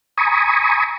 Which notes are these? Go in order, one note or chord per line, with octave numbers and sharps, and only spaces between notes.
G#5 A#5 B5 C#6 D#6